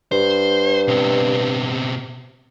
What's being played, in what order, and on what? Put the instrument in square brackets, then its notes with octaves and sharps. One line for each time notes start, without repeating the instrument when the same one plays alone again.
[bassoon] G2 [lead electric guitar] C5
[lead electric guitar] B2 C4